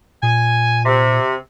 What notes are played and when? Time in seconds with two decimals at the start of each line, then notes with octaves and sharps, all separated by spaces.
0.23 A#2 G#5
0.86 C3